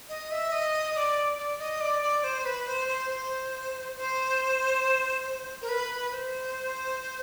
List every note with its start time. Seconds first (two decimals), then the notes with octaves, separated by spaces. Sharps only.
0.09 D#5
0.31 E5
0.52 D#5
0.95 D5
1.38 D5
1.59 D#5
1.81 D5
2.03 D5
2.24 C5
2.45 B4
2.67 C5
2.88 C5
3.10 C5
3.96 C5
5.62 A#4
5.69 B4
6.11 C5